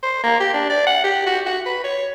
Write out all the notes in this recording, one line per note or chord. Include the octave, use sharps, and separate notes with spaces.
C5
A#3
G4
D4
D5
F#5
G4
F#4
F#4
B4
C#5